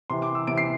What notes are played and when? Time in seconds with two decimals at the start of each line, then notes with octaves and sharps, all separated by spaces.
0.10 C3 E3 C6
0.22 D6
0.35 E6
0.47 C3 E3 D7
0.58 C7